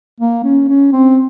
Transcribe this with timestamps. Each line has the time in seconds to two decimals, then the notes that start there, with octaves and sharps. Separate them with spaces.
0.20 A#3
0.44 C#4
0.68 C#4
0.92 C4